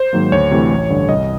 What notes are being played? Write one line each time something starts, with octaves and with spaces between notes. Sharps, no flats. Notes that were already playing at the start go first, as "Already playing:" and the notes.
Already playing: C5
G#2 D#3 F#3 A#3
D2 C#5
C3 E3 A3
A1
G2 D3
C2 D#5